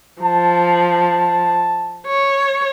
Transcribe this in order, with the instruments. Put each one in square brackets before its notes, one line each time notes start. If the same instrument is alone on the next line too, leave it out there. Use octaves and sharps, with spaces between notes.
[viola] F3 [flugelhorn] A5
[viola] C#5